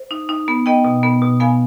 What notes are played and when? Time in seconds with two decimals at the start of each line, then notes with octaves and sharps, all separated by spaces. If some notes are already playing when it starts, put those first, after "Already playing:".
Already playing: C5
0.11 D#4
0.29 D#4
0.48 B3
0.66 B3 D#5 G5
0.85 B2
1.03 B3
1.22 B2
1.40 B3 F5 G#5